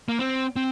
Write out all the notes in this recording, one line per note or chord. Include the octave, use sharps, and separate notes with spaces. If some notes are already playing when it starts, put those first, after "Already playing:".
A#3
C4
C4